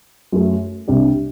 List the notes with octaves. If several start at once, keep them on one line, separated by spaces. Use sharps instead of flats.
F#2 F#3 A3
C2 C3 G3 D4 G4